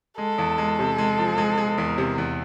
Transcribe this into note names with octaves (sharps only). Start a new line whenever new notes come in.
G#3 A4
E2
G#3
C3
G#3
F3
G#3
G#3
E2 A#4
C3
E2